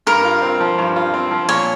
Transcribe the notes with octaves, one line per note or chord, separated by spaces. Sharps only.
G2 A#4
F4
C4
F3
G2
F4
C4
F3
A#2 C#5